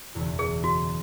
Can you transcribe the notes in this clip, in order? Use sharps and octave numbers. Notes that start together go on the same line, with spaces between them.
F#1 E2 B2
G#4
F#4